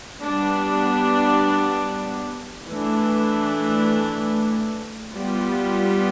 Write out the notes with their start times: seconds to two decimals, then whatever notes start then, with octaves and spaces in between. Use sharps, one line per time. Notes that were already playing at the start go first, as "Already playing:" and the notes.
0.24 G3 B3 D4
2.69 E3 A3 D4
5.15 G3 B3 F4